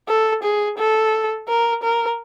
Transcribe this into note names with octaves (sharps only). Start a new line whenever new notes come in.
A4
G#4
A4
A#4
A#4